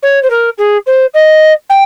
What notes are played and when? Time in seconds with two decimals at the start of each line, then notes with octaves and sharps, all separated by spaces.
0.02 C#5
0.23 C5
0.30 A#4
0.58 G#4
0.86 C5
1.14 D#5
1.69 G5